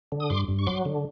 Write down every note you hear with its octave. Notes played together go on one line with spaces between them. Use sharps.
D3
D#6
G2 C6 D6
G2
C#6
F#3 C6 D6
D3